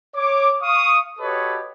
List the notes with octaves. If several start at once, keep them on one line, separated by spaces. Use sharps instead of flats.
C#5 D6
F5 C#6 D#6
F#4 G4 A4 B4 C#5 D#5